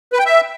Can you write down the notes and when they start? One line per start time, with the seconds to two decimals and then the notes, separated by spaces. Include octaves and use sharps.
0.13 B4
0.19 G5
0.26 E5